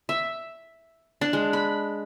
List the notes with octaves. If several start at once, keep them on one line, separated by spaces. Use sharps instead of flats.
E5
D4
G#3
B5